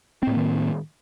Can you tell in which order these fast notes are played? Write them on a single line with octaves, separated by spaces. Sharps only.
C4 A2 A#3 D#3